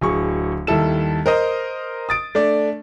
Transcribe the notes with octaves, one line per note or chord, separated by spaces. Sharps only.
D1 G#4 C#6
D#2 G3 E4 A4 E7
A#4 C5 D#5
D#6 A6 D7
A3 D4 D5